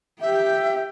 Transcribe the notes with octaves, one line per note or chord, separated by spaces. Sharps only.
G4 E5 G5